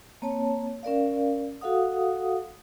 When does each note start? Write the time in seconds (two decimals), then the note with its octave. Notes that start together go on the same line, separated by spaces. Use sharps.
0.22 A#3 C4 C#5 A5
0.83 C#4 A#4 D5 F5
1.61 F#4 A4 F5 F#5 D#6